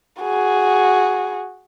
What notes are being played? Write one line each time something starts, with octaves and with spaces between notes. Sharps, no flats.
F#4 G#4